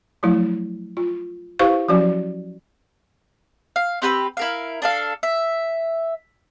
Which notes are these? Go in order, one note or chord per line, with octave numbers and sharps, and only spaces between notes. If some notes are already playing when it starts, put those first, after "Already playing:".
F3 F#3 A3 E4
F4
E4 G4 B4 C5 F5 C#6
F3 F#3 C#4 F#4 D5
F5
C4 G4 B4 E6
E4 A#4 F5
D4 A4 F5
E5